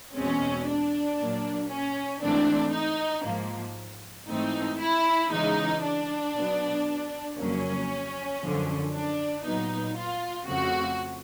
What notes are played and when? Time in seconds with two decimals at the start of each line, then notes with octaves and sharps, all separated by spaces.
0.14 E2 B2 G#3 C4 C#4
0.67 D4
1.18 A#2 F#3 A#3
1.69 C#4
2.21 G#2 E3 A3 C4 D4
2.72 D#4
3.25 G#2 F3 A#3
4.28 G#2 E3 A3 C4 D#4
4.80 E4
5.30 C#3 E3 G#3 D#4
5.83 D4
6.35 B2 F#3 B3
7.37 F2 C#3 F#3 A#3 C#4
8.41 F#2 D3 F3
8.93 D4
9.44 A#2 F#3 B3 D#4
9.96 F4
10.47 F2 C#3 F3 A3 C4 F#4